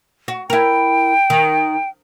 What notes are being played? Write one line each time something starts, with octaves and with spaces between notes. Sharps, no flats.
F#4
E4 A#4 G5
D#3